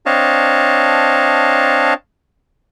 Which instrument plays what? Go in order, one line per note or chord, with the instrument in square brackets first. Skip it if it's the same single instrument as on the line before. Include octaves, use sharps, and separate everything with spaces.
[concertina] C4 D4 C#5 D#5 F5 A5